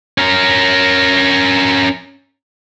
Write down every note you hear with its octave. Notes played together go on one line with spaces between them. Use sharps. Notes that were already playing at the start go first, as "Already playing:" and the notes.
C#4 A#4